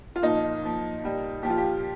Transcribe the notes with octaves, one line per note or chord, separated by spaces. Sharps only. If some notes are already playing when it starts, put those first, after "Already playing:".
F4
A#2 F3 D#4
A#2 F3
A#2 G3
A#2 F3 G4
F4
G4